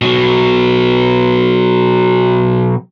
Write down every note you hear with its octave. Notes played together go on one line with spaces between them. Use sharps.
B2 F#3